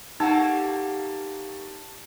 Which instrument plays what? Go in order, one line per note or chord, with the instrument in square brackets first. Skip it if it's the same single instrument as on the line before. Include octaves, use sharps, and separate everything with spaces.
[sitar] G3 A3 A#3 [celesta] D#4 [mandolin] F#5 A#5 E6 [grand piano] A5